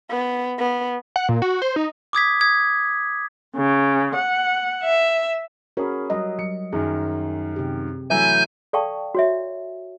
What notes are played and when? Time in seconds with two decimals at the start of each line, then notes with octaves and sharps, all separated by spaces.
0.10 B3
0.58 B3
1.16 F#5
1.29 A#2
1.42 F#4
1.62 C5
1.76 D#4
2.13 D6 D#6 G#6 B6
2.41 D#6 G#6
3.55 C#3
4.14 F#5
4.83 E5
5.77 C#4 F#4 G#4 A#4 B5
6.10 F#3 G3 D#5
6.39 F#3 C#7
6.73 F#2 D#3 G#4
7.56 C3 G4
8.10 E3 F#3 A3 B4 E5 G#5 G6
8.73 A4 D5 F5 G5 A5 C#6
9.15 F#4 C#5 E5